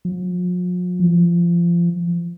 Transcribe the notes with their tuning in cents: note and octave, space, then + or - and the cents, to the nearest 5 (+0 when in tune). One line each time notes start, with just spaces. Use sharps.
F3 +45
F3 -25